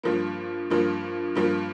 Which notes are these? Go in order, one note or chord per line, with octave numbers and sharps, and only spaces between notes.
G2 F3 A#3
G2 F3 A#3
G2 F3 A#3